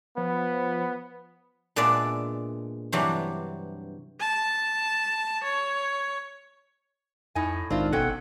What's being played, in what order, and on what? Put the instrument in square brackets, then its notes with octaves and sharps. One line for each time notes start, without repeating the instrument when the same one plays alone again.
[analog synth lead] F3 [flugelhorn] B3
[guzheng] A#2 G#3 B3 D4 D5 E5
G2 C3 E3 F#3 D4
[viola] A5
C#5
[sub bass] F2 [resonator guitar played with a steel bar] A2 D#4 G#5
[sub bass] A#1 [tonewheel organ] G#2 D#3 D4 [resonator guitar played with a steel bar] C4 F4
[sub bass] G1 [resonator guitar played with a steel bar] G#2 C#4 G5 [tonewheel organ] B2 F#5 [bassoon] A4